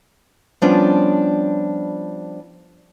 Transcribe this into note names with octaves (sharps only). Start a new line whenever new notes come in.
F3 G3 B3 C#4 D4 F4